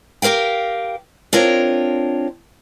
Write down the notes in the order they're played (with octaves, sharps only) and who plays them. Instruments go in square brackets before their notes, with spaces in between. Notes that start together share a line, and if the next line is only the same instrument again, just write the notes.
[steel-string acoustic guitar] G4 G#4 A#4 F5 G5
C4 D4 F4 A#4 C#5